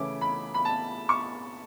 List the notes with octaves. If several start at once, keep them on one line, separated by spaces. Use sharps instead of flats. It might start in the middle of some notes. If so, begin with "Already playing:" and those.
Already playing: C#3 E3 A3 C#4 E4 D6
B5
B5
A5
C#6